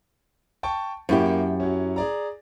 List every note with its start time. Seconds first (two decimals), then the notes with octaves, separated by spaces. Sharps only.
0.63 G5 A5 C#6
1.09 F#2 A#3 E4 G4
1.60 F#3 C#4
1.96 G#4 D5 A#5